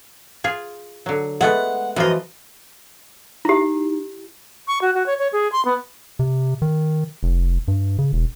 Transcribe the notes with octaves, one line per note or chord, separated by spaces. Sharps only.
F4 G#4
D3 F#3
G#3 A3 B3 F#5
F#2 E3 F3 F4 D#5
D#4 E4 G4
C#6
F#4
F#4
C#5
C#5
G#4
C6
B3
C3
D#3
F1
G2
C#3
E1